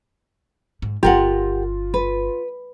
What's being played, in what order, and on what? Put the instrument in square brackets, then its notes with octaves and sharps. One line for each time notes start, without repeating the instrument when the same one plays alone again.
[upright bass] G#2
[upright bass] G1 C4 [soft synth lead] F4 [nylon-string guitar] G4 A#4 F#5
[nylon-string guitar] B4